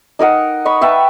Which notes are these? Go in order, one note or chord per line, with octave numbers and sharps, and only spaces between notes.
D#4 A#4 D#5 F#5
D#5 B5 C#6
B4 E5 G5 A5